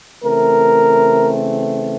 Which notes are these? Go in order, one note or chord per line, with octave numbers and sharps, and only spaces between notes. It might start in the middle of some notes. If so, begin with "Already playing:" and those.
C#3 E3 A3 C4 A#4